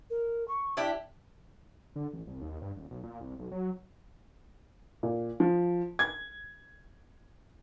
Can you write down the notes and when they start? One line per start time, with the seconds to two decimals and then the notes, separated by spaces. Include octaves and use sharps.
0.10 A#4
0.48 C#6
0.77 D4 E4 G4
1.96 D3
2.13 A1
2.27 C2
2.41 D#2
2.62 G2
2.77 D#1
2.91 B1
3.03 A#2
3.20 C2
3.39 B1
3.52 F#3
5.03 A#2
5.40 F3
5.99 G#6